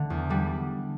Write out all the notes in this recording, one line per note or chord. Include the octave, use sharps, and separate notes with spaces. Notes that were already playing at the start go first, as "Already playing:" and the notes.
Already playing: D3 A3
E2
D3 G3